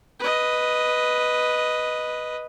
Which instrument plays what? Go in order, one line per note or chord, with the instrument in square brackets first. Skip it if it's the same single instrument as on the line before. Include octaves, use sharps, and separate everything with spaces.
[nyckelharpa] B4 D#5